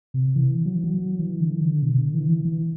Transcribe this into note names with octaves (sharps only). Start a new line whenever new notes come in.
C3
E3
F#3
E3
F#3
E3
D3
E3
D3
B2
D3
E3
E3
E3